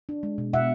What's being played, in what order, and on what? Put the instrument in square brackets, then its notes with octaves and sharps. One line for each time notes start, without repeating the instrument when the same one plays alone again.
[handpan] D4
G#3
B2
B2 E5 F#5